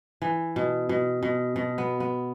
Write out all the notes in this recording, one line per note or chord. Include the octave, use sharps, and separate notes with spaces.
E3
B2
B2
B2
B2
B3
B3